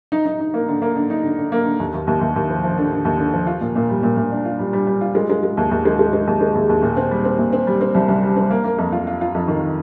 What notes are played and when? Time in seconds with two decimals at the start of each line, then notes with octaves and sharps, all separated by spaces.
0.12 D#4
0.26 D#4
0.40 D#4
0.54 A#3
0.68 D3
0.82 A#3
0.96 D3
1.10 D#4
1.24 D3
1.38 D3
1.52 A#3
1.66 D3
1.80 D#2
1.94 D#2
2.07 D#2
2.21 D#2
2.36 D#2
2.49 F3
2.64 F3
2.78 D3
2.92 D3
3.05 D#2
3.19 D3
3.33 F3
3.47 F4
3.61 A#2
3.76 A#2
3.90 G3
4.03 A#2
4.17 A#2
4.32 D4
4.45 F4
4.59 G3
4.73 G3
4.87 G3
5.01 F4
5.15 G#3
5.30 G#3
5.43 G#3
5.57 D#2
5.71 D#2
5.85 G#3
5.99 G#3
6.13 G#3
6.27 D#2
6.41 G#3
6.55 D#2
6.69 D#2
6.83 A#2
6.97 C4
7.11 G3
7.25 C4
7.39 A#2
7.52 C4
7.67 G3
7.81 C4
7.95 C2
8.09 C2
8.23 G3
8.36 C4
8.50 A#3
8.64 A#3
8.78 F2
8.92 F4
9.07 F4
9.21 F4
9.35 F2
9.48 D#3